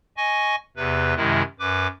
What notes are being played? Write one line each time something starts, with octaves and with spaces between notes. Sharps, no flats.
D#5 G#5 C#6
E2 C3 B4
F#2 C3 D#3 G#3 E4
F#2 B4 D6